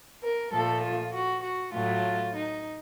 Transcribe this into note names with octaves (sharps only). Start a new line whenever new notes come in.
A#4
A#2 F3 A3 A4
F4
F#4
F#4
A2 F#3 A3 F4
D#4